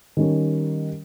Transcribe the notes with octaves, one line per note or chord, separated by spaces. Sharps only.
D#3 G3 C#4